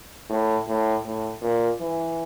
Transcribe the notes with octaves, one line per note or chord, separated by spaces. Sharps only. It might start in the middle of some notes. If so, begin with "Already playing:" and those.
A2
A2
A2
A#2
E3